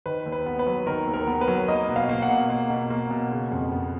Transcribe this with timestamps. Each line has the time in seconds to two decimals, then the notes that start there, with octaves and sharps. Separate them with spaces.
0.06 D#3 B4
0.26 D#2
0.32 B4
0.46 B3
0.59 B4
0.67 F#3
0.86 D#3 A#4
1.07 D#2
1.14 A#4
1.27 B3
1.41 B4
1.48 F#3
1.68 A#3 D#5
1.89 B2
1.96 F5
2.09 A#3
2.22 F#5
2.30 B2
2.50 A#3
2.70 B2
2.90 A#3
3.11 B2
3.31 C#3
3.52 F2
3.72 B3